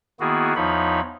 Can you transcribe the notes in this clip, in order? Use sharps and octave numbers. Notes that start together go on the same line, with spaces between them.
D#3 A#3 B3 E4 F#4 G#4
E2 F3 D#4 F4 C#5 B5